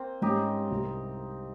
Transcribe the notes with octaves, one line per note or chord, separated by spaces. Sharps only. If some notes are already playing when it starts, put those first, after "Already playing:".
Already playing: A#3 C4
G#2 G3 C#4 D#4 G4
C2 C3 G3